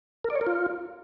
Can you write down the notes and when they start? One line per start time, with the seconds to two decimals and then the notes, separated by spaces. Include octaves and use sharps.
0.24 A#4
0.30 D5
0.36 C#5
0.41 A#4
0.47 F4